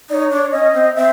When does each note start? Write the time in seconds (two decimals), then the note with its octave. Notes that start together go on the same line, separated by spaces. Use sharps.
0.10 D#4 D5
0.14 C#5
0.31 D4
0.52 C#4 D#5
0.74 C4
0.96 C4 E5